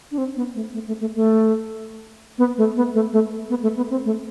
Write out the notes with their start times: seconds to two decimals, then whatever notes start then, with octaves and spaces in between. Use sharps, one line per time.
0.11 D4
0.18 C4
0.36 B3
0.55 A3
0.74 A3
0.87 A3
1.01 A3
1.15 A3
2.38 B3
2.58 A3
2.76 B3
2.94 A3
3.13 A3
3.50 B3
3.63 A3
3.77 B3
3.90 C4
4.05 A3